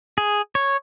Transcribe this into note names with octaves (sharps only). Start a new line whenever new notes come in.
G#4
C#5